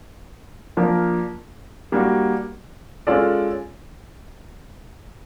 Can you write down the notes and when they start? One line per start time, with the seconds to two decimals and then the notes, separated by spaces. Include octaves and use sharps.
0.77 F3 A#3 D4 F4 A#4
1.92 G3 A#3 D4 F#4
3.07 G#3 C#4 F4 A4 D5